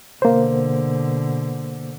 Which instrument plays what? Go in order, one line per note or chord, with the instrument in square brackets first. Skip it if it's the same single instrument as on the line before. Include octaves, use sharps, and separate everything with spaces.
[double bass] B2 D3 [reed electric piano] A#3 C5